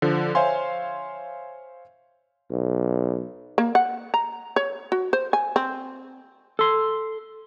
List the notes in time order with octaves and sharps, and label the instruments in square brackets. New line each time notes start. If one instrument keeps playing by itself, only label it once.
[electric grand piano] D3 F3
C5 C#5 E5 F5 G#5 C6
[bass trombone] B1
[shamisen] A#3
F#5
A#5
C#5
F#4
C5
G#5
C4
[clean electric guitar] A4 C6